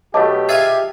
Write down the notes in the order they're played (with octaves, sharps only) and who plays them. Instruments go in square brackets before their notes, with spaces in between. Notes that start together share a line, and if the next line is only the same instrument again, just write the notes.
[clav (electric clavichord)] B1 B2 A3 [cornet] G4 [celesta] D#5 A5 D6
[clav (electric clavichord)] F4 G#4 [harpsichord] E5 F5 G#5